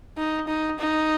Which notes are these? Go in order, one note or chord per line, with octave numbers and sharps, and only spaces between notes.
D#4
D#4
D#4